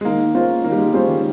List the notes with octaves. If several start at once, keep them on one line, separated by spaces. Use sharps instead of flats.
G#3
D#3 A#3
G#3 A#3 C#4 F4 C5
D#3 A#3
G3
G#3
G3 G#3 C#4 F4 C5
D#3